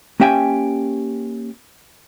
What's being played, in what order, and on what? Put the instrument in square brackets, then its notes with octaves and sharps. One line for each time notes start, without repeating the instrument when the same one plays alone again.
[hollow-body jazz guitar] A#3 C#4 G4 E5 G5 G#5